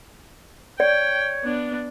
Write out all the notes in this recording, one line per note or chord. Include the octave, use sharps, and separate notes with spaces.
C#5 D5 G5
B3 D4